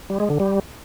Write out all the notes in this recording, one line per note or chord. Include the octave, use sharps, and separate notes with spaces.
G3
G#3
D3
G3